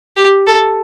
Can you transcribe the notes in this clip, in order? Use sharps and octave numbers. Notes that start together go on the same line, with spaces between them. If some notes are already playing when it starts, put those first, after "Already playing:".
G4
A4